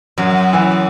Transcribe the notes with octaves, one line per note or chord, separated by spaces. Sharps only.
F#2 F#3
E3